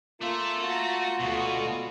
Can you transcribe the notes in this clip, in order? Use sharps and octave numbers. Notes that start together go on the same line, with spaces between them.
A3 A#3 F4 A4
F#4 A#5
D2 B2 F#4 A4